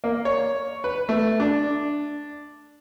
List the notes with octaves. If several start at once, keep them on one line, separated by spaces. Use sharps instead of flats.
A#3
C#5
B4
A3
D4